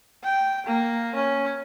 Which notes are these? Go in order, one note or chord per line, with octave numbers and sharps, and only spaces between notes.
G5
A#3
C#4